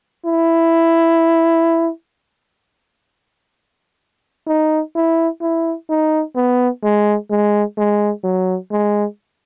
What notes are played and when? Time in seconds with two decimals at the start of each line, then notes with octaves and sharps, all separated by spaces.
0.25 E4
4.47 D#4
4.95 E4
5.41 E4
5.90 D#4
6.36 B3
6.83 G#3
7.31 G#3
7.78 G#3
8.24 F#3
8.72 G#3